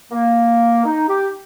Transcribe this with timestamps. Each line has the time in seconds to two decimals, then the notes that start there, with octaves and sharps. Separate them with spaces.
0.11 A#3
0.84 D#4
1.08 G4